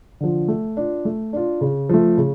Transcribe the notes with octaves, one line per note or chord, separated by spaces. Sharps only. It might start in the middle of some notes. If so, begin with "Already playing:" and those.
D3 F3
A3
D4 F4
A3
D4 F4
C#3
F3 A3
C#3